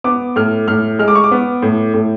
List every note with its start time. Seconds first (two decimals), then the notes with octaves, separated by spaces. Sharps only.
0.04 B3 D6
0.36 A2 F6
0.68 A2 F6
0.99 G#3 F6
1.08 D6
1.15 C#6
1.24 D6
1.31 B3
1.62 A2
1.94 A2